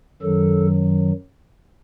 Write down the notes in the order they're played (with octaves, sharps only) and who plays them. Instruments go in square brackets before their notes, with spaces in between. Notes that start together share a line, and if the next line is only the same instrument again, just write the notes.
[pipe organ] F#2 D#3 F#3 A4